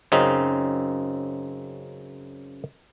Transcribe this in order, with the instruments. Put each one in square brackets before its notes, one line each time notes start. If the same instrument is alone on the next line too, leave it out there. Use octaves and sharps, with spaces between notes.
[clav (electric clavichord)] F#2 C#3 C4 D#4